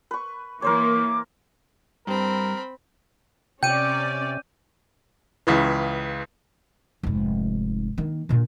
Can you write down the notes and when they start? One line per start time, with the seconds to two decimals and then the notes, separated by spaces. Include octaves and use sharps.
0.11 B4 C#6
0.62 E3 A#3 A#4 C5 C#5 D6
2.07 G2 C4 A#4 B5
3.63 C3 C#4 D5 G5 G6 D#7
5.47 C#2 C#3 E3
7.03 F1 G#2
7.98 D#3 A#3
8.29 A#2 D3